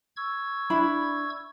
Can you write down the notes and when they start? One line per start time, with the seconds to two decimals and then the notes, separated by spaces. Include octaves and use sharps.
0.17 C#6 E6 G#6
0.70 D4 E4 B5